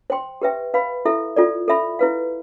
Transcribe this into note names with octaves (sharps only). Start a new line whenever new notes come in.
C5 G5 C6
G4 B4 E5 G5
B4 F5 B5
E4 A4 E5
F4 A4 D5
A4 E5 B5
E4 B4 F5